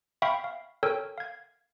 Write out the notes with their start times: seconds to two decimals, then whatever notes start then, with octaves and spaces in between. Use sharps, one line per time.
0.22 E5 F5 G5 B5 C#6
0.44 F5
0.83 A4 A#4 C#5 G5 E6
1.18 F5 G#6